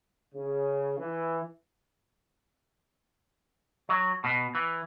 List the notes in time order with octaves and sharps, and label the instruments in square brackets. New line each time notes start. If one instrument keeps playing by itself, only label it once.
[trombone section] C#3
E3
[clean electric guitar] F#3
B2
E3